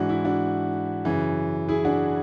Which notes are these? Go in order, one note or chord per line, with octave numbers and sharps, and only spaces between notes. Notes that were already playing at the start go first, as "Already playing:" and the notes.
Already playing: G#2 E3 D4 F#4
E4
D4 F#4
F#2 C#3 E3
E4 G#4
D4 F#4